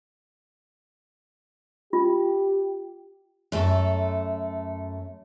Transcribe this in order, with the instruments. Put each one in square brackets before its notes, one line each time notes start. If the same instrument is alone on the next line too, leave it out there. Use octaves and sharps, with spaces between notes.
[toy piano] F4 [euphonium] G4
[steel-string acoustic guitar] F#2 A3 A4